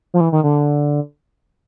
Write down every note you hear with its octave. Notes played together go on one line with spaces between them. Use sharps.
F3
E3
D#3
D3